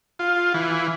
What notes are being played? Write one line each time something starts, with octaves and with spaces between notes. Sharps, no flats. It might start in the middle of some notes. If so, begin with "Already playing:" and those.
F4
E3